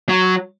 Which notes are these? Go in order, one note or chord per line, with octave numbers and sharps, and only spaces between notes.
F#3